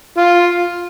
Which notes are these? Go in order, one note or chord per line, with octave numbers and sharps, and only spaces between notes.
F4